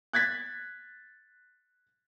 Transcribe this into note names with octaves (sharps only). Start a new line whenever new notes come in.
F#6 G#6 A6 B6